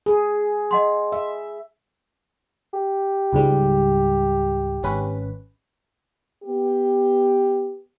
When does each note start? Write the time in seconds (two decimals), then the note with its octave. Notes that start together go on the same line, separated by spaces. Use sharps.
0.06 G#4
0.71 D#5 F#5 C6
1.12 E5
2.74 G4
3.33 C#2 G#2 G3
4.83 G#1 C#4 B4
6.45 B3 G4